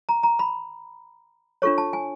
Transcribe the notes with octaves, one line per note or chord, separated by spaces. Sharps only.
A#5
A#5
B5
D4 F4 A4 C#5 C#6
A5
G#5